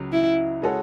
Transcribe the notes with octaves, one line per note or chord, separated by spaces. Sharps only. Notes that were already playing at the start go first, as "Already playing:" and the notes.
Already playing: C#2 C#3 F#3
E4
C#3 G#3 C#4 F#4 A4